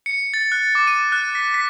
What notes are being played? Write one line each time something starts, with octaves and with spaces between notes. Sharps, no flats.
C#7
A6
F#6
D6
D#7
F#6
B6
B6